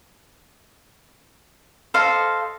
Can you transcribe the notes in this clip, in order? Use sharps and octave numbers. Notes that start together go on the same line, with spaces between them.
A4 C5 D#5 F5